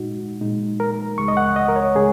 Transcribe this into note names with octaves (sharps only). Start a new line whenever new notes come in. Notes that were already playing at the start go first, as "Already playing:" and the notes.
Already playing: A#2 G#3 D#4 F#4
A#2 G#3 D#4
A#4
C#2 C#3 G#3 C#6
D#5
F#5
D#5
A#4
C#5
C#3 G#3 G#4